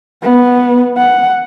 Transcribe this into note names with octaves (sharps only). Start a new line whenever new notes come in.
B3
F#5